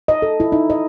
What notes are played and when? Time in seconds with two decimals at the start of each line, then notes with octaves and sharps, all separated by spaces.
0.08 D#5
0.22 A4
0.40 E4
0.52 D#4
0.70 D#5